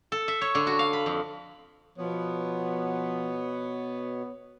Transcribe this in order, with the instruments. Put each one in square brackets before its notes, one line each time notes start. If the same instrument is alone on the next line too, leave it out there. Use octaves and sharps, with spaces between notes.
[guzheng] A4
E5
C#5
D3
F#4
F5
B5
F2
[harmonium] B2 C#5 [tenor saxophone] F3 [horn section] B3